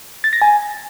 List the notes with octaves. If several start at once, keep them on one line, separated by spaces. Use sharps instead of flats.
A6
A#6
G#5